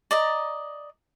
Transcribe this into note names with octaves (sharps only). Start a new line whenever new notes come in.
D5 D#5 A#5